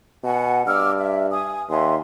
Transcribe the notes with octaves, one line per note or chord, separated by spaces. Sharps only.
B2 F#5 G#5
G2 D6 E6 F6
E5
G#5 D#6
D#2 E5 G#5 C6